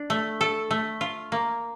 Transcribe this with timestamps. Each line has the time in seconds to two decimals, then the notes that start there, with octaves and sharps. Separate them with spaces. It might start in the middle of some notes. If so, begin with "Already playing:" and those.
Already playing: D4
0.10 A3
0.41 A4
0.71 A3
1.01 F4
1.32 A#3